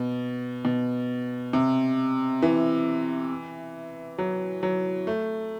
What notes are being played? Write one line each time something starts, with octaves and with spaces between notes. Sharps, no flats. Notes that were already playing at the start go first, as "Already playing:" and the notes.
Already playing: B2
B2
C3
E3
F#3
F#3
A3